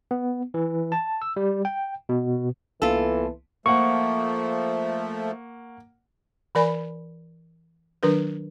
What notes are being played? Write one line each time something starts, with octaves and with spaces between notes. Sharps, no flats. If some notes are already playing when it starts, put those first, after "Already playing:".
B3
E3
A5
E6
G3
G5
B2
C2 E3 A#3 B3 F4 A4
F3 A3 A#3 F#5 C#6
E3 A#4 D5 G#5 B5
D#3 F#3 D4 A#4 B4